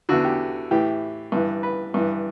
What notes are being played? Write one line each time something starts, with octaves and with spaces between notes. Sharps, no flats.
E2 D3 F#4
G4
A2 E3 G4
G2 E3
B4
G2 E3